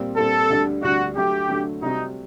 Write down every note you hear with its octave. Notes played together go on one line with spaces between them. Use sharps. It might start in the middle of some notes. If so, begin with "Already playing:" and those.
Already playing: A#2 G3 C4
A#2 G3 C4 A4
D2 D3 G3 D4
D2 D3 G3 D4 F#4
D3 F#3 A3 G4
D3 F#3 A3
C3 G3 C4 D#4 F#4